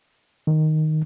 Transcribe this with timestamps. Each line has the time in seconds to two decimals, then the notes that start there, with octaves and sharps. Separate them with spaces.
0.47 D#3